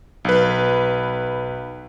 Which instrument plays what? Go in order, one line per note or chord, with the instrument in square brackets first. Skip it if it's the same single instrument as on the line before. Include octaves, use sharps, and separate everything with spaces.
[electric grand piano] B1 B4